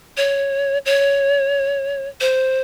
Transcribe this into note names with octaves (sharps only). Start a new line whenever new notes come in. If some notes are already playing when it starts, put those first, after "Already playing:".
C#5
C#5
C5